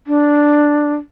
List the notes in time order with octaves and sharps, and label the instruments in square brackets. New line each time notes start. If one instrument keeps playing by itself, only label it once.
[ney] D4